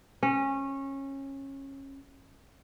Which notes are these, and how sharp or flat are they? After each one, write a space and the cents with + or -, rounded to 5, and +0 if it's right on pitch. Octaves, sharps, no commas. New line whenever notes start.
C#4 -20